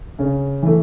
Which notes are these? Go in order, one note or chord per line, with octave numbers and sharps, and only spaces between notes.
C#3
E3 A3